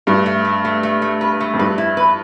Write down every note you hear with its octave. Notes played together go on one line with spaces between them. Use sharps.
G2 A3
A3
A3
A3
A3
A3
B4
A3
F2
G2 B4
E4
B4